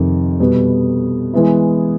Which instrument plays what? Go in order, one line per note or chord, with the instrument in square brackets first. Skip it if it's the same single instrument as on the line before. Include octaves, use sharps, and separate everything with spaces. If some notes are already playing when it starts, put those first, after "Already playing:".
Already playing: [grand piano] F2 C3 D#3
B2 G3 B3
E3 G#3 B3 E4